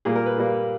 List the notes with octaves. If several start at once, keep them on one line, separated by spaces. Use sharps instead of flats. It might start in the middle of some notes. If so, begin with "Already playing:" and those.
A#2 G3 A#3 G#4
A#4
B4
A#2 G3 A#3